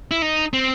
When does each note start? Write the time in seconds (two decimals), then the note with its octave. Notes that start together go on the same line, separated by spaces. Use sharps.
0.11 E4
0.22 D#4
0.53 C4